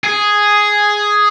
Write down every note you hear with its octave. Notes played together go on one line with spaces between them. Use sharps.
G#4